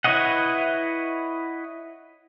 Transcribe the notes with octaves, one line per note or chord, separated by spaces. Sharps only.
E4 B4 C#5 D#5 F#5